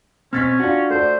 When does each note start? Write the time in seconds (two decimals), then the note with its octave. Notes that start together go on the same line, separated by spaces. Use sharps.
0.33 B2 C4 C#4 F6 A6 B6
0.60 D4 F4 F#4
0.90 A3 C5 D5